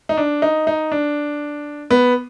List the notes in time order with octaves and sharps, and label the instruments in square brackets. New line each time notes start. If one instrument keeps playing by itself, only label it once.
[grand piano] D#4
D4
D#4
D#4
D4
B3